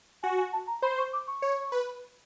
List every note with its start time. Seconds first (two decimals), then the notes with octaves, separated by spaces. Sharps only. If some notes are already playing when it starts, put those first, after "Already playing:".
0.23 F#4 G#5
0.38 G#5
0.53 A5
0.67 A#5
0.82 C5 B5
0.98 C#6
1.13 D6
1.27 C#6
1.42 C#5
1.72 B4